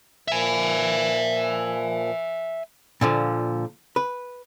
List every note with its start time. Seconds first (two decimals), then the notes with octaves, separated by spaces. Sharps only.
0.28 A#2 F3 E5 G#5
3.01 A#2 D3 F3
3.96 B4